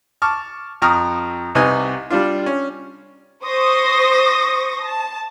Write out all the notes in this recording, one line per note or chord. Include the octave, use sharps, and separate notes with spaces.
A5 C#6 D6 F6
F2 G5 A#5 C#6 D#6 F6
C2 C3 D#4 B4 D#5 G#5
G3 D4 F4
C#4
C5 C#6 D#6 A#6
A5